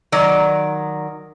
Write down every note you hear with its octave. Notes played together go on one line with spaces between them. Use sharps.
D#3 F#3 D5